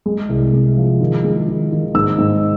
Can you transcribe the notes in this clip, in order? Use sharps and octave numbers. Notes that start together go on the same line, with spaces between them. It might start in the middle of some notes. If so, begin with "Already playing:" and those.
G#3
C2
G#3
F3
D#3
G#3
D#3
D#3
G#2 E6
G#2